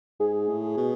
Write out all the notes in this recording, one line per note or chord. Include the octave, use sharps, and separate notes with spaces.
G#2 G#4
A2
B2